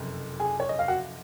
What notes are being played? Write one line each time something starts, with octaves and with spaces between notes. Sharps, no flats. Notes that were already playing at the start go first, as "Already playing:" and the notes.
Already playing: F#1 F2 C3
G#4 G#5
C#5
D#5
F5
F#4 F#5